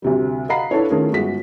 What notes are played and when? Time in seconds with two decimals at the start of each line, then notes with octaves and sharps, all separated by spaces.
0.02 D2 C3 G3
0.49 D#5 F5 F#5 A#5 B5 C7
0.71 D4 E4 A4 B4 C#5
0.90 D#3 A3 C#4 F4 G#4 A#4
1.13 G1 G#3 F#4 B6